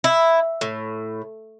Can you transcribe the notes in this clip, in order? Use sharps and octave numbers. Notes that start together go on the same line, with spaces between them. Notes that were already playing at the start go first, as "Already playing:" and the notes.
E4
A2